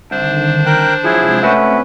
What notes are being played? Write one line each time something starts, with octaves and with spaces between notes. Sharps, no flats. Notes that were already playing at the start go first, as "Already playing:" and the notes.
C2 D3 D#3 D4 C5
A#4 G5 F#6
C3 F3 F#3 G#3 E4 G#4
A3 C4 C#4 F#4 B4 E5